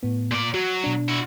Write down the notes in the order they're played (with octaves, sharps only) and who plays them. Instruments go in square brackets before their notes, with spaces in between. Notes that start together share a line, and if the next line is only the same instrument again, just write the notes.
[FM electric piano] A2 B3
[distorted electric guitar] A#2 D5
[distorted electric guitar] F#3 [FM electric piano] F#4
[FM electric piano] B2 D4
[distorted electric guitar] E4 F#4